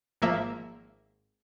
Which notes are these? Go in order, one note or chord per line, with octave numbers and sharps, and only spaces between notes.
G#1 F3 A#3 E5